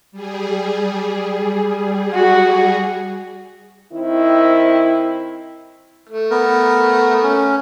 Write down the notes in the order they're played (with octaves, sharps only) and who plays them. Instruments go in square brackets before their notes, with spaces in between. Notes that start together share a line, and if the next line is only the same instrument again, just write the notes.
[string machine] G3 G#4
[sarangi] F#4
[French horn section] D#3 C4 E4
[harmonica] A3
[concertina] B3 A#4
C#4